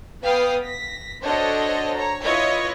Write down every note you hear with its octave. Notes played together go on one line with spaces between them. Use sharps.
B3 B4 F5 G5 D#6
A#6 B6
D4 F#4 A4 C5 C#5 D#5
C#5 A#5
E4 F4 B4 C#5 D#5 E5